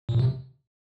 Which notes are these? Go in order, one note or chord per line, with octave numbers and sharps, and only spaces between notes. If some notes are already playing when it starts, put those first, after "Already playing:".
A#2
C3